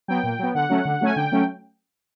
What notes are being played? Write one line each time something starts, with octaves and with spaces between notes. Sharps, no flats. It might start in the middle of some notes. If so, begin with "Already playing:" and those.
F#3 B3 G5
A#2
F#3 B3
D3 F#5
F#3 A3 C#4
D3
F#3 A3 C#4 G#5
D3 G5
F#3 A3 C#4